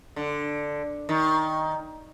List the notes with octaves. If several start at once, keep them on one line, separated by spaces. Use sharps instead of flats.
D3
D#3